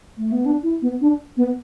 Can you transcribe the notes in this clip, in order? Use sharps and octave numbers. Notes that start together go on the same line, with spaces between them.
A3
B3
D4
E4
B3
D4
B3